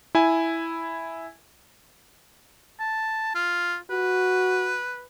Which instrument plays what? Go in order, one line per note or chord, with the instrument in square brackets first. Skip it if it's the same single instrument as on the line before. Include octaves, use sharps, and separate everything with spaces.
[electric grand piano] E4 G#5
[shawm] A5
F4
[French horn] F#4 [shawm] B4